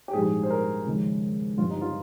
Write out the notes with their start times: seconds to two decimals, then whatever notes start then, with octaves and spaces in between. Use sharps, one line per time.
0.08 G4
0.13 A#1 G#2 G3 G#4
0.43 C5
0.50 A#4
0.86 D#2 C#3 F3 G#3
1.57 G1 G2 G3 F4
1.70 D#4
1.81 F4